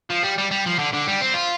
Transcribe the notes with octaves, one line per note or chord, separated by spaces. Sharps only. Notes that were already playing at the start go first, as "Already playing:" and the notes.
F3
G3
G3
G3
F3
D3
D3
G3
C4
F4